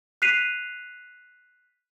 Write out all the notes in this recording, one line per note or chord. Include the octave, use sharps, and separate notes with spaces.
F#6 B6 C7 D#7 F7